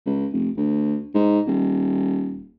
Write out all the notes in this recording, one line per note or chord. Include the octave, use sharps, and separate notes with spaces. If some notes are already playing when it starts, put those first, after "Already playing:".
C#2
F1
D2
G#2
D#1